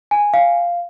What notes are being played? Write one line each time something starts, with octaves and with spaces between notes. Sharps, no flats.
G#5
F5